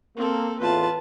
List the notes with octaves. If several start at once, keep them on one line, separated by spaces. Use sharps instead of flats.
A#3 C4 A4
E2 A2 F4 B4 A5